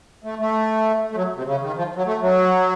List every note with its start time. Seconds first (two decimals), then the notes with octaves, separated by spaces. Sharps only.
0.24 A3
0.39 A3
1.11 A3
1.16 F#3
1.36 C3
1.45 C#3
1.61 D#3
1.76 F3
1.96 F#3
2.06 A3
2.21 F#3